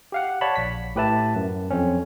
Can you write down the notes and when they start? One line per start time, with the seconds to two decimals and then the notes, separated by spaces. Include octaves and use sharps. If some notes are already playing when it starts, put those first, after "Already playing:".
0.12 G4 F5 F#5
0.41 C#5 D5 F#5 A5 B5
0.56 A#1 B6
0.95 A2 G4 B4 E5 A5
1.36 F#2
1.70 F2 C4 C#4